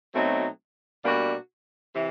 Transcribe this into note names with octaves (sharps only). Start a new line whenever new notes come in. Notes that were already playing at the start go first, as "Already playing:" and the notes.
B2 F#3 A3 C4 D#4
B2 G3 A#3 D4 F#4
C3 E3